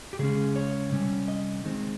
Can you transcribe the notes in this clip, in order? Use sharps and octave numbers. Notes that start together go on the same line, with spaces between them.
G4
C#3 G#3 C#4 G#4
C#5
C3 G3 C#4
D#5
D#3 G#3 C4